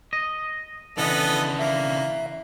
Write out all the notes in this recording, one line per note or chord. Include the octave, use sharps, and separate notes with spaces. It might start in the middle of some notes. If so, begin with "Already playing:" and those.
D#5
C#3 E3 B3 D4 A4 D#5
A#3 E5